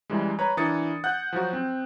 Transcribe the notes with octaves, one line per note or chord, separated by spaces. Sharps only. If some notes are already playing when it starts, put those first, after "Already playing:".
F#2 E3 G3 G#3
B4 C#5 A#5
E3 D4 A#4 D#6 A6 C#7
F#5 F#6 G6
F3 F#3 F#4
C4